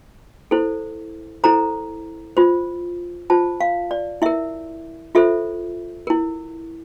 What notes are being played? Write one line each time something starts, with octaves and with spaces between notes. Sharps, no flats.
E4 A4 C5
E4 A4 C5 A#5
F4 C5
F4 C5 A5
F5
D5
E4 A#4 E5
F4 A4 C5 E5
E4 A#4